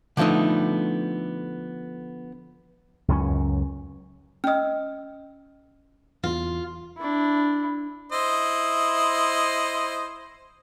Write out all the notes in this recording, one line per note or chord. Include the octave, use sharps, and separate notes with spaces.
D3 F3 A3 B3 D#4
C#2 F#2 G#3 C#4
C#4 D#5 E6 F6
E2 F4
D4 E4
E4 C5 D#5